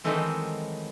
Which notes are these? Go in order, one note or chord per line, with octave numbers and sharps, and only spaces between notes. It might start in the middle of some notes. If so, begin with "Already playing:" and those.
D#3 E3 F#3 G#3 A3 C4